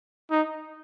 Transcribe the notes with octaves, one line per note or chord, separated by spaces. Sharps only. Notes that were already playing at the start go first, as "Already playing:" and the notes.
D#4